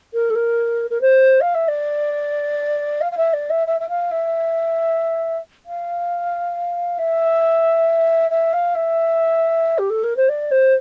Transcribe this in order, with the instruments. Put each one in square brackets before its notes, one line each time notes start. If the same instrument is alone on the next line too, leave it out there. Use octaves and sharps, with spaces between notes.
[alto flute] A#4
A4
A#4
A#4
C5
F5
E5
D5
F5
F5
E5
D5
E5
E5
E5
F5
E5
F5
E5
E5
F5
E5
G4
A4
A#4
C5
D5
C5